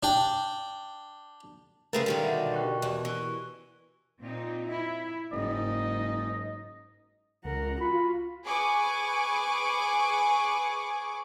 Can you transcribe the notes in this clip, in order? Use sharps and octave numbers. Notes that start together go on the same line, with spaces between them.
D4 G5
C#3 G#3 A3 A#4 B4 F5 A6
D3 D#3 G3
B2 D5 E5 F#5
G5 C#6 F#6
E2 G4 D5 F#6
E3 C#6
A#2 C4 D#4
E4
F#1 G#2 D#4 D#5
C#2 A#4 F#5
F4 F#4 B5
G#4 B4 G#5 C#6 D6